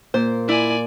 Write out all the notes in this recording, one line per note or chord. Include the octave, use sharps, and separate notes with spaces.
A#2 C5
E4 D5 G#5